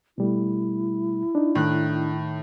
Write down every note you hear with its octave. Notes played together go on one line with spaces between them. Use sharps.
B2 G3 A3 E4
D4 D#4
A2 D#3 F#6